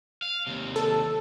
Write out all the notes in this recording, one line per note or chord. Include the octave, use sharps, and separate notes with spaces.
F5
D#2 C3
A4